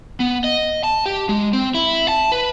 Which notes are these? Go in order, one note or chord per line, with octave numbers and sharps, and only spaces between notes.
B3
D#5
A5
G4
G#3
C4
E4
A5
B4